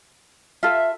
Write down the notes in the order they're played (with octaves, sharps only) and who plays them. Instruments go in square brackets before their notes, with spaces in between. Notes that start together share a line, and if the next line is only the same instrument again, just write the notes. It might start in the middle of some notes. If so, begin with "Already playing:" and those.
[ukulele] F4 A4 [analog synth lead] E5